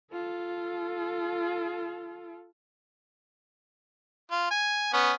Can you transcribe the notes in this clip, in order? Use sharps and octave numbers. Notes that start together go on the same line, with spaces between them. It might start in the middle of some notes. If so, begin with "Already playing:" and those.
F4 A4
F4
G#5
B3 C#4